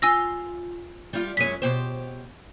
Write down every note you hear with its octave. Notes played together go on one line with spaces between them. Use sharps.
F4 G#5 E6 A#6
G3 F4
F#2 G#3 C#4 B6 D#7
B2 G4 C5